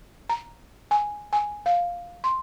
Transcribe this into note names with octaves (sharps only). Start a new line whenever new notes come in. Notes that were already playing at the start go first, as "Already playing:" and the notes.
A#5
G#5
G#5
F5
C6